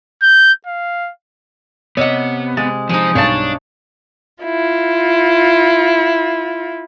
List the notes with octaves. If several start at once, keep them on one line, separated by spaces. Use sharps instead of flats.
G6
F5
C3 B3 C#5 D#5 F#5
G#3 A6
F3 G#3 D#4 C5
B1 G2 D4 C#5 A5 A6
E4 F4